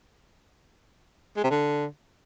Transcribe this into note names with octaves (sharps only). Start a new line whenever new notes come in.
G#3
C3
D3